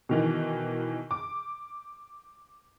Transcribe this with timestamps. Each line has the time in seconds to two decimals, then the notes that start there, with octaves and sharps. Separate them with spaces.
0.09 B2 D#3 E3
1.11 D6